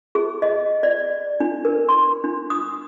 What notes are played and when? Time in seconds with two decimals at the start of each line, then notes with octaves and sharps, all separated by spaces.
0.15 G#4
0.42 D#5
0.83 D5
1.40 D4
1.65 A#4
1.89 C6
2.24 D4
2.50 D#6